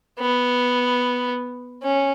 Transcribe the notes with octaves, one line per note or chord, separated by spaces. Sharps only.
B3
C#4